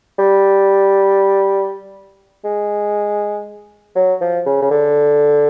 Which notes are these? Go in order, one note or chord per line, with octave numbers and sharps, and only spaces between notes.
G3
G#3
F#3
F3
C#3
C#3
D3